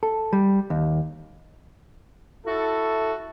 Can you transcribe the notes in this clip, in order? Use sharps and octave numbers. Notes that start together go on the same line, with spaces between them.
A4
G3
D#2
E4 F#4 A4